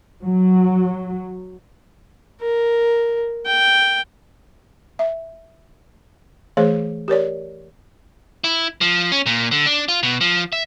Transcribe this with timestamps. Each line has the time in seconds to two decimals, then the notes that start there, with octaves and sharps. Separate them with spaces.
0.24 F#3
2.41 A#4
3.46 G5
4.99 E5
6.57 E3 A3 G#4 C5 C#5
7.08 G4 A#4 C#5 D5
8.44 E4
8.81 F3
9.12 C#4
9.26 A#2
9.51 D3
9.66 D4
9.89 F4
10.03 B2
10.21 F3
10.53 E5